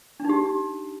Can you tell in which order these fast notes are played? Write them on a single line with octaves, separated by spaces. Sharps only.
D4 D#4 G4